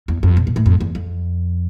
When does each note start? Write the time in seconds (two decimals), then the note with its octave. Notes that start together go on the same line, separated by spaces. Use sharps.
0.08 E2
0.23 F2
0.37 B2
0.47 B2
0.56 A2
0.66 F2
0.81 E2
0.95 F2